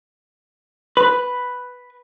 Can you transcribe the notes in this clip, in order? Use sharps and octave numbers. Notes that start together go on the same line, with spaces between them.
B4